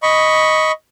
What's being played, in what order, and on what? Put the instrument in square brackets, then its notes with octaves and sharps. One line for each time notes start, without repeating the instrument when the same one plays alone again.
[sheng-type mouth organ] D#5 B5 C#6